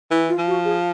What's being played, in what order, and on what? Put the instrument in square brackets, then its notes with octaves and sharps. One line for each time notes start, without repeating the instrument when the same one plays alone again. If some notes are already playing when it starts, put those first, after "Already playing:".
[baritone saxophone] E3 [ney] E4
[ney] F4
[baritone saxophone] F3
[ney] F#4
G#4